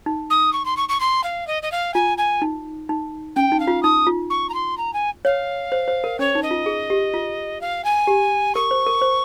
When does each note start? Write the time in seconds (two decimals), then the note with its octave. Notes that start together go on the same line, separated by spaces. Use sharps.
0.06 D#4
0.30 D#6
0.53 C#6
0.65 C6
0.77 C#6
0.89 C#6
1.00 C6
1.24 F5
1.47 D#5
1.63 D#5
1.72 F5
1.94 F4 G#5
2.18 G#5
2.42 D#4
2.89 D#4
3.36 C#4 G5
3.52 D#4
3.60 F5
3.67 F4
3.83 D#4 D#6
4.07 F4
4.30 C#6
4.49 A#5
4.54 C6
4.78 A#5
4.94 G#5
5.25 C#5 F5
5.72 C5
5.88 C5
6.04 A#4
6.19 C#4 C#5
6.35 D#4
6.43 D#5
6.51 F4
6.66 G#4
6.90 G4
7.14 F4
7.61 F5
7.85 G#5
8.07 G4
8.55 A#4 C#6
8.71 C5
8.86 A#4
9.02 C5